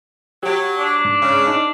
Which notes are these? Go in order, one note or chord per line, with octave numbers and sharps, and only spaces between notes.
F#3 G4
D4
G#2
C#3
D4 D#4